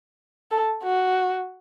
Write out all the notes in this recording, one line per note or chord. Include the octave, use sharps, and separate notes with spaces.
A4
F#4